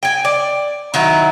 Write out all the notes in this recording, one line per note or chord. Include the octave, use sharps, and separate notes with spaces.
G5 G#5
D5
D#3 F#3 E4